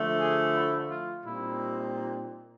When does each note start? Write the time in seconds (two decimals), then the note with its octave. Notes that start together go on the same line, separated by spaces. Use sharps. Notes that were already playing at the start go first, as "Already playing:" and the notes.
Already playing: D3 F3 A3
0.18 G#4
0.53 E4
0.89 F4
1.24 A#2 G3 C4 D#4 E4